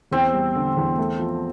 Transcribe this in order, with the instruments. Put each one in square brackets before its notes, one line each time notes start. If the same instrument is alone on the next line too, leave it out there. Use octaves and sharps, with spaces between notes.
[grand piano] E2 [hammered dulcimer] C4
[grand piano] G3
D3
E2
A3
F3